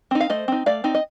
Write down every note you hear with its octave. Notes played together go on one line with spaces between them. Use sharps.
C4 D#4
F5
A3 C5 D#5
C4 D#4
A3 D5 F5
C4 D#4
D#5